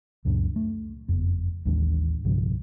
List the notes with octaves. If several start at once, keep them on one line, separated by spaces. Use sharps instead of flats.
C#2 F#2 A#2 D4
A3
F#1 F2 B3
A1 D#2 G#3 D4
B1 G2 C#3 F3